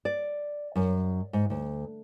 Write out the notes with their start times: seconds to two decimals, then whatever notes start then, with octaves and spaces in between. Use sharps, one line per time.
0.05 D5
0.76 F#2
1.33 G#2
1.50 D2